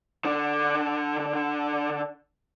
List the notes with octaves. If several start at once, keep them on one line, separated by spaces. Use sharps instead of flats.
D3 D4